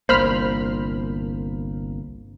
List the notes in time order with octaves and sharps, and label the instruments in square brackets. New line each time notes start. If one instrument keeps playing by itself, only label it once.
[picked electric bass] G1 C2 A#3 [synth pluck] C5 B5 F6